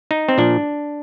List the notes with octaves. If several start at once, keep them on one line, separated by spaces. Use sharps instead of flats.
D#4
C4
A#2 F3 D4